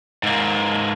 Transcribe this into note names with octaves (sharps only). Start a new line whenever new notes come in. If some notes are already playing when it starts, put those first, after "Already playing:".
G#2 A#3